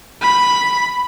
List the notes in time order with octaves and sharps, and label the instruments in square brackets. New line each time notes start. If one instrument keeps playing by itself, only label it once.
[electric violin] B5